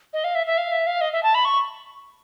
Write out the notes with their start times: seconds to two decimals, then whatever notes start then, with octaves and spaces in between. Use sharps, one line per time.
0.13 D#5
0.24 F5
0.35 E5
0.46 E5
0.58 F5
0.72 E5
0.87 F5
1.01 D#5
1.13 E5
1.23 A5
1.35 B5
1.45 C#6